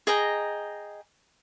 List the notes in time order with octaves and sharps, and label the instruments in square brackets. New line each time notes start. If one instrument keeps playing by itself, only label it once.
[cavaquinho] G#4 D#5 G5 A#5